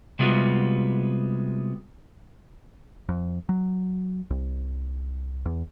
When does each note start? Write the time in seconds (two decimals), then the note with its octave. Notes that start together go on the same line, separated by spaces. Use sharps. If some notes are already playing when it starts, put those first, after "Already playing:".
0.19 C3 G3 G#3 B3 F4 F#4
3.09 F2
3.49 F#3
4.30 C2
5.46 E2